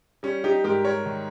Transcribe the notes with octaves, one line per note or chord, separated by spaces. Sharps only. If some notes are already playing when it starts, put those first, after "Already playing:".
G3 C#4
D#4 G4
G#2 G4 A#4
A#4 C#5
D#3